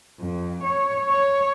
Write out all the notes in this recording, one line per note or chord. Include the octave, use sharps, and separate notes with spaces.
F2
C#5
C#5